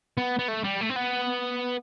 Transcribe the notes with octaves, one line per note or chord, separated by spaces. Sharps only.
B3
B3
A3
G3
A3
C4
B3